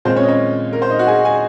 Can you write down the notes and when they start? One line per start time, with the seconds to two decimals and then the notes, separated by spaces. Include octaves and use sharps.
0.05 A#2 G#3 C4 C5
0.16 C#4 C#5
0.23 D#5
0.28 C#4 C#5
0.73 A#4
0.82 C5
0.90 D#4 D#5
0.99 F#4 F#5
1.08 G#4 G#5
1.25 G#4 G#5